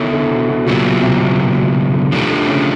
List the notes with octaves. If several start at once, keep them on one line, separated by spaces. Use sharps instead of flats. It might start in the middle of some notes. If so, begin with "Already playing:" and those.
Already playing: D#3 B3 E4 A4 C#5 E5
D3
B2
B2
A#2 C#3 F#3 B3 E4 G4
B2
C3
B2
A#2
B2
B2
C3
D3
D#3 F3 A3 D4 G4
D3
C#3